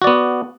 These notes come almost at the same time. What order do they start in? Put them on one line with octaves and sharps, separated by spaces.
F#4 D5 B3